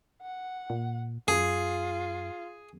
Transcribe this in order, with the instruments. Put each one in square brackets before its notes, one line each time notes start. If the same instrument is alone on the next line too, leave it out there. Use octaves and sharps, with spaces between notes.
[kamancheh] F#5
[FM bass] A#2
[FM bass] F#2 [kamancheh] F4 [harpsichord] G#4